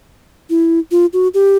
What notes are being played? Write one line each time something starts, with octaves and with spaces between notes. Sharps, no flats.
E4
F4
F#4
G4